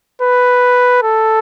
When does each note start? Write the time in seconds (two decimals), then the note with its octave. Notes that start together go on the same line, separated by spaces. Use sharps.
0.22 B4
1.03 A4